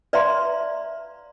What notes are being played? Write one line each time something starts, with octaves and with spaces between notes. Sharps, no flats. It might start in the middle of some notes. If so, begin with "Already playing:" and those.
B4 D5 E5 F5 A#5 C6